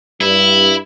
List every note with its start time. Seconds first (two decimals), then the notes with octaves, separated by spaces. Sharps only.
0.21 G2 E4